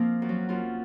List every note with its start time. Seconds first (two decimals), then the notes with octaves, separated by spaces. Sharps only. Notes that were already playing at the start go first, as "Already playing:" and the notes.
Already playing: F3 A#3 C4
0.22 F#2
0.29 F#3
0.49 F#2 F4